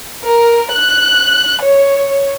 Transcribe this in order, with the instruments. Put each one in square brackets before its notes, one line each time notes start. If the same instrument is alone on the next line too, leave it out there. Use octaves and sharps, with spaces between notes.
[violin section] A#4
F#6
C#5